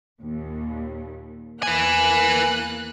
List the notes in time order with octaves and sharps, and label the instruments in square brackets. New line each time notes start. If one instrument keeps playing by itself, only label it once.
[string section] D#2 A#2
[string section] E2 A#3 F#6 [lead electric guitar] B4 G#5